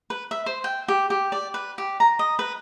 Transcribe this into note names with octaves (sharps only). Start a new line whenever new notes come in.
B4
E5
C5
G5
G4
G4
D5
B4
G4
A#5
D#5
B4